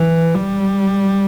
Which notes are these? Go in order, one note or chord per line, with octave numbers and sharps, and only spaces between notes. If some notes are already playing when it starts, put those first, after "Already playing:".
Already playing: E3
G3